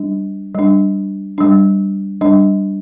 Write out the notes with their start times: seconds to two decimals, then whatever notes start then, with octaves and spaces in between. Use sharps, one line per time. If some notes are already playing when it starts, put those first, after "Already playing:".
Already playing: G3 D4
0.55 G3 D4
1.38 G3 D4
2.21 G3 D4